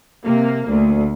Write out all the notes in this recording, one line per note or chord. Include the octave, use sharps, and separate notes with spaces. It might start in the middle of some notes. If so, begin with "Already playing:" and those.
C3 A#3
D2